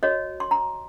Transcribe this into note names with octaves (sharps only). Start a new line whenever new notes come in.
F#4 C#5 D#5
C6
A#5